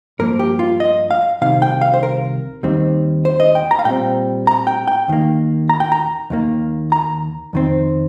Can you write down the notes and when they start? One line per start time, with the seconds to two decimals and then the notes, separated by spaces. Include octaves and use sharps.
0.19 G2 F3 A#3 A#4
0.39 G4
0.59 F4
0.80 D#5
1.11 F5
1.42 C2 C3 D#3 F5
1.62 G5
1.81 F5
1.94 C5
2.03 A#4
2.63 D#2 D#3 G3 C4
3.25 C5
3.40 D#5
3.55 G5
3.71 A#5
3.79 F5
3.85 A#2 G3 C4 G5
4.47 A#5
4.67 G5
4.88 G5
5.08 D#2 D#3 A#3
5.69 A#5
5.80 G5
5.92 A#5
6.30 D#2 D#3 A#3
6.92 A#5
7.53 F2 D#3 C4